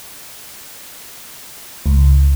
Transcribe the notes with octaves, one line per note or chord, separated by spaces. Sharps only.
C#2